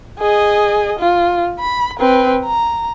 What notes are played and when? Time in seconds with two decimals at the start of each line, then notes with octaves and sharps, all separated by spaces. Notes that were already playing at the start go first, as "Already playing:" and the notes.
0.19 G#4 D#5
0.99 F4
1.59 B5
1.99 C4 B4
2.45 A#5